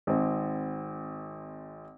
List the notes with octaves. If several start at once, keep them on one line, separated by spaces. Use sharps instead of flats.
G#1 C4